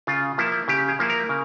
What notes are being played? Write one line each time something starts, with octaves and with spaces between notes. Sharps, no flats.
C#3 F4
F3 A#3 E4
C#3 G4
G#4
F3 A#3 E4
A#4
C#3